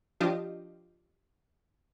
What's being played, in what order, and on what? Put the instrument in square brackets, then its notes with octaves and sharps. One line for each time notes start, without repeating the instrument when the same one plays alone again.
[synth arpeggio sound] F3 D4 F4 G4 D#5